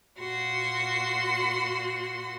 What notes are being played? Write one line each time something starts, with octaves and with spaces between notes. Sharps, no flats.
A#2 F#4 C6